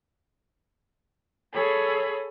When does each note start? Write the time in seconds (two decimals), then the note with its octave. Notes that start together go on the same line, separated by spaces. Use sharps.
1.53 G#4 A4 C#5 B5